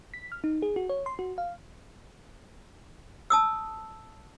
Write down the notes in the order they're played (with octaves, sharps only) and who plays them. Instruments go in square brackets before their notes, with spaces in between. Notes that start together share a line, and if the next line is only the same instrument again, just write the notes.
[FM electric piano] B6
F6
D#4
G#4
F#4
C#5
C6
F#4
F5
[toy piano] A5 D#6 E6